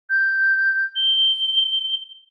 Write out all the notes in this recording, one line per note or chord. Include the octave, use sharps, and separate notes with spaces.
G6
G7